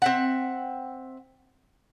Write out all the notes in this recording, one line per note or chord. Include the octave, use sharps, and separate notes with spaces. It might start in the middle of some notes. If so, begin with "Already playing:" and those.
C4 E5 F#5